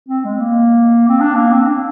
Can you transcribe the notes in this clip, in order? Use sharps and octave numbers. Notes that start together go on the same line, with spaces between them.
C4
G#3
A#3
C4
D4
A#3
C4
D4